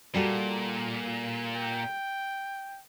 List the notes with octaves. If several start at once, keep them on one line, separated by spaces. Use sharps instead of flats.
A#2 G3 F#4 A4
G5